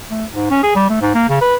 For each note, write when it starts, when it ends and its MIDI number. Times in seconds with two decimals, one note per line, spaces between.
0.11 0.25 57
0.34 0.50 44
0.51 0.62 61
0.63 0.72 68
0.75 0.87 55
0.90 1.01 57
1.01 1.10 44
1.14 1.26 58
1.29 1.38 49
1.41 1.56 71